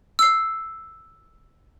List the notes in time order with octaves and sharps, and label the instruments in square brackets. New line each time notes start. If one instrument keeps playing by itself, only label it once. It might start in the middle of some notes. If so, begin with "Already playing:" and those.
[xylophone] E6 C7